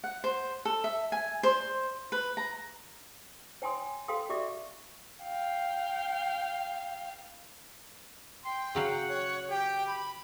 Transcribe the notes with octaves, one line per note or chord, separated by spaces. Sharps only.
F#5
C5
A4
E5
G#5
C5
B4
A#5
C#5 G5 G#5 C6 D#6
A4 F5 G5 C6 D#6
F#4 D5 E5 C#6 D6
F5 G5
G5 C6
C#3 F#3 F5 F#5
C#5
G4 G5
B5